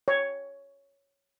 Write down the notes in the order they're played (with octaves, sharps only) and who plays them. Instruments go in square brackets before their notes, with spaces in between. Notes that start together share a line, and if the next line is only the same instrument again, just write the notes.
[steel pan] C#5